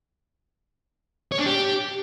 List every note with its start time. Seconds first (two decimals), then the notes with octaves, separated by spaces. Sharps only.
1.32 C#5
1.39 D4
1.46 G4